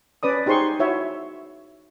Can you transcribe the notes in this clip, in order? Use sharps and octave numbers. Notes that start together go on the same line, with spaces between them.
C#4 B4 D5 D#6
D#4 G4 G#4 C5 C6 C#6
E4 F#4 C#5 E5